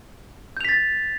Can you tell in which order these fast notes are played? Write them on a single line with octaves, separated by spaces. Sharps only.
G6 F7 B6 A6